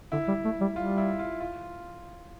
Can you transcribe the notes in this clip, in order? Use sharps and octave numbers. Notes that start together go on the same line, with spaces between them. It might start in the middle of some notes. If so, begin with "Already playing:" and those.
D3 E4
G3
A3
G3
G3 F4
E4
F4
F4